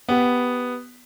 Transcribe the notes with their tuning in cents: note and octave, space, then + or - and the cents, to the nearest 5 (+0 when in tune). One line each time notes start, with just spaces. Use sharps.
B3 +0 G4 +0